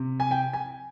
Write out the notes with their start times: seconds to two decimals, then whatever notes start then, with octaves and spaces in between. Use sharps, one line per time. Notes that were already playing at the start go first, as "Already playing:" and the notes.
Already playing: C3
0.20 G#5
0.31 G5
0.53 G#5